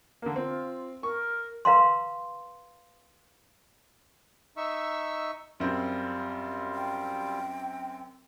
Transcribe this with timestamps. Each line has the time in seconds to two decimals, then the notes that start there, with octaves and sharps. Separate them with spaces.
0.22 D3 A#3
0.36 C4 F4
1.03 A#4 C#6
1.65 B4 F5 A#5 C6
4.57 D#4 E5 C#6 E6
5.60 F#2 G3 C4 F4
6.75 G5